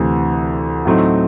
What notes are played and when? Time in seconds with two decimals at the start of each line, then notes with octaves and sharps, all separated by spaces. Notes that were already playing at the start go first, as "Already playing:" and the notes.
Already playing: D2 C3 E3
0.85 A2 F#3 A3 C4 D#4